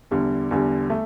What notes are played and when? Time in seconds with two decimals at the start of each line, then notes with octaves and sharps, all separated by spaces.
0.11 E2 D3 G3
0.51 E2 D3 G3
0.90 A3